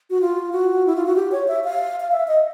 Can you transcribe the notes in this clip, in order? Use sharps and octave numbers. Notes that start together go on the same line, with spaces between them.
F#4
F4
F#4
E4
F4
F#4
G4
C#5
E5
F5
F5
E5
D#5